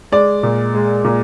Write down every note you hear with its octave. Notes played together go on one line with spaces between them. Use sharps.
G#3 D5
A#2
G#3
A#2